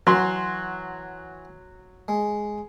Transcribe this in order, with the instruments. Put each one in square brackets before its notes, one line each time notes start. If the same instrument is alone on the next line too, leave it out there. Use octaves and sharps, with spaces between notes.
[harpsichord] E3 F#4 [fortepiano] F#3 C6
[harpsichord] G#3